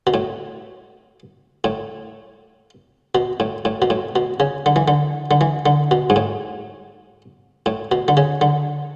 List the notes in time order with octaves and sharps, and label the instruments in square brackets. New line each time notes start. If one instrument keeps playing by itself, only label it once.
[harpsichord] B2
A2
A2
B2
A2
A2
B2
A2
B2
C#3
D3
E3
D3
D3
E3
D3
B2
G#2
A2
A2
B2
D3
C#3
D3